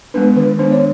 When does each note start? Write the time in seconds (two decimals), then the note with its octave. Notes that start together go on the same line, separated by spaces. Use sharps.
0.14 G#3 B3 D4 B4
0.36 D#3 B4
0.59 G#3 B3 D4 C5
0.72 C#5